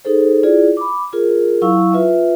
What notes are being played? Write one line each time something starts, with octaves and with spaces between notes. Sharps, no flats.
D#4 G#4 A4 C5
E4 F4 G#4 D5
B5 D6
F4 G#4 A#4
F#3 E4 F5 C#6 E6
F4 B4 E5